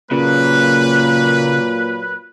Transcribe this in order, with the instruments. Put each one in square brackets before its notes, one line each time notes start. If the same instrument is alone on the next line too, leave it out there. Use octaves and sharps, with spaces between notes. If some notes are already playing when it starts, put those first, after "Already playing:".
[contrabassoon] A#2 [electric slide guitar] C#3 [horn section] F#3 A#3 B4